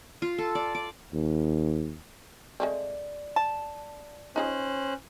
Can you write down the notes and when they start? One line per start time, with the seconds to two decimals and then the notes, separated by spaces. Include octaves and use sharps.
0.22 F4
0.38 A4
0.55 D5
0.75 D5
1.14 D#2
2.60 G#3 A3 C4 D5
3.36 A5
4.36 C#4 D#4 F4 G#4 C5 F#6